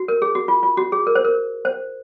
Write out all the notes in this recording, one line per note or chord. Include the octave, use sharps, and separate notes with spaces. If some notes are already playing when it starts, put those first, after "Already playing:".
Already playing: F#4
A#4
G#4
F#4
F4
F4
F#4
G#4
A#4
C5
A#4
C5